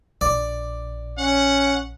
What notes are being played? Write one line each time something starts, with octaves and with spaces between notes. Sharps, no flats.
A#1 D5
C#4 F#5